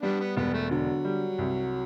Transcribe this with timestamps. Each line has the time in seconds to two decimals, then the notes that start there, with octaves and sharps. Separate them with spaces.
0.02 G3 B3 D4
0.20 B3
0.36 E1 B3
0.54 A3
0.71 D3 F#3
1.05 G3
1.38 C2